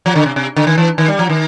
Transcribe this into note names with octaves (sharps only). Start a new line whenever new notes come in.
F3
D3
C3
C3
D3
D#3
E3
D#3
G3
F3
D#3